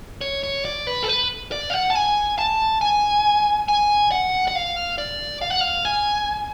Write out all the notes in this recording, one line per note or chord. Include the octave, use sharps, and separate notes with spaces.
C#5
C#5
D5
B4
A4
B4
D5
F5
F#5
A5
G#5
A5
G#5
G#5
F#5
F#5
F5
D5
F5
F#5
F5
G#5